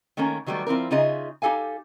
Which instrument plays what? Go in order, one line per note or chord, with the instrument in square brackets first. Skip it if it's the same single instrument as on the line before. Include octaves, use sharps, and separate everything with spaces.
[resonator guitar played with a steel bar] D#3 A3 A#3 C#4 A#4
D#3 F#3 G3 A3 B3
F3 C4 E4 A#4
C#3 D#4 F4 G#4 D#5 E5
D#4 G4 A4 F5 G#5